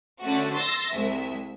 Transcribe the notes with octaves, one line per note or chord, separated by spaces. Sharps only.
D3 A3 C#4 F#4
C6 E6 A6 A#6
C2 G#3 E5